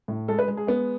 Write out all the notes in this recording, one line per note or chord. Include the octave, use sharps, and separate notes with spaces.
A2
G#3 A4
B4
G#3
G#4
G#3 B3